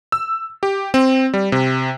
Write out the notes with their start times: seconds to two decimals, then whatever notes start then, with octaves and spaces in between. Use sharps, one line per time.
0.12 E6
0.63 G4
0.94 C4
1.34 G3
1.52 C3